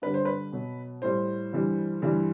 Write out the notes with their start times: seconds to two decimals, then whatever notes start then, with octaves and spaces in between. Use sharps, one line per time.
0.02 G2 D3 G3 B4
0.14 C5
0.25 B4
0.52 B2 F#3
1.02 A2 G3 C5
1.53 G2 E3 G3
2.02 G2 E3 G3